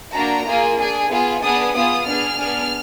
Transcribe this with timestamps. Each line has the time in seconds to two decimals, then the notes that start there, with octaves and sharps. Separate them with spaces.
0.15 A#3 D4 F#4 A#5
0.47 A#3 F4 G#4
0.79 D4 G#4
1.10 B3 F4 G#4
1.42 B3 D4 G#4 D#6
1.74 B3 F4 G#4 D#6
2.06 B3 D4 G#4 F6
2.38 B3 D4 G#4